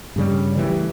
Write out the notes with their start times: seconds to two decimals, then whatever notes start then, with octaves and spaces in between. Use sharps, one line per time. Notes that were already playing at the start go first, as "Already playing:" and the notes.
0.16 G2 C#3 G3
0.56 A1 D#3 E3 G3